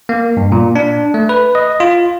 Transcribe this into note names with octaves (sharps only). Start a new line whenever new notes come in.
A#3
G2
A#2
D4
A3
B4
D#5
F4